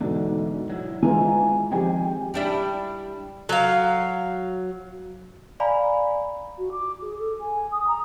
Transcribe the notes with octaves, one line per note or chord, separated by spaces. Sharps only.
E2 G#2 B2 D3
F#3 E4
E3 G#3 F4 G#5 A#5
D#3 F3 C4 G4 G#4 G5 G#5
G3 D4 E4
F#3 F5
D5 F5 G#5 A#5 B5
F#4
D6
G#4
A4
G#5
D#6
A#5